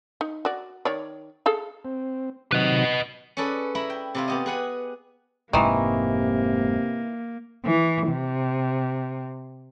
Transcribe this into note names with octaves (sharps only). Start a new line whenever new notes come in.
D#4
F#4 D5
D#3 C#5 D5
G#4 A4 F5
C4
C3 D#3 F#3 B4 D#5
C#4 G#4 A4 B4 D5
E4 E5 A#5 B5
G5
C3 E4 F4
B3 G4 D#5
G#4 B4 F#5 G#5
F1 G#2 C3 D#3 E3 G#3 A#3
E3
C3